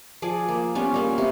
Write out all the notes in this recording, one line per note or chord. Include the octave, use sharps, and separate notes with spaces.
F3 G#4 D5
A#3
G3 B3 C#4 F4
G3 A#3 C#4
C3